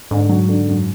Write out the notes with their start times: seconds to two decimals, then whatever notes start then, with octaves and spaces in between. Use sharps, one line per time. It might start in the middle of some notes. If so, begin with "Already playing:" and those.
0.11 G#2 D3
0.29 F#3
0.49 D3
0.68 F#2